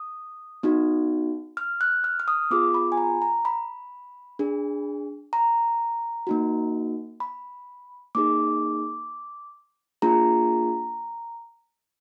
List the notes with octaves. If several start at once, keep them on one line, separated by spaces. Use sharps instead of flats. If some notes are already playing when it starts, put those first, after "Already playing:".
Already playing: D#6
B3 D#4 F#4
F6
F#6
F6
F6
D#6
B3 F4 G#4 D6
B5
G#5
A#5
A#5
B5
D4 G#4
A#5
A#3 D#4 F#4
B5
A#3 D#4 G#4 D6
A#3 D4 F4 G#4 A#5